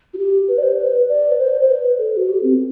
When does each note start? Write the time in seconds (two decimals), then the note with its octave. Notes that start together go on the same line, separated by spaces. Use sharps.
0.14 F#4
0.18 G4
0.48 B4
0.58 D5
0.63 C5
0.78 B4
1.08 D5
1.32 B4
1.39 C5
1.61 C5
1.68 B4
1.98 A4
2.17 F#4
2.29 G4
2.43 C4